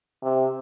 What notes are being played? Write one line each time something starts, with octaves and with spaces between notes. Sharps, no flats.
C3